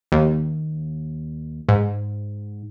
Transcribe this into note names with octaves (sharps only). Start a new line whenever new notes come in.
D#2
G#2